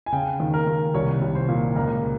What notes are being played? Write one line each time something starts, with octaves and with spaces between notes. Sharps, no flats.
G#5
C#3 G5
D#2
A#4
D#2
C2 C#5
C2
C5
A#2
C#2 A#4